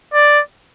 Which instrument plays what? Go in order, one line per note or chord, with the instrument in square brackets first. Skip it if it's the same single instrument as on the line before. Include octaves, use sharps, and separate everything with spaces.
[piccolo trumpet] D5